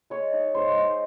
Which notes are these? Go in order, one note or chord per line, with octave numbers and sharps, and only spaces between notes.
G#3 C#5
D#4
G#3 C5
D#4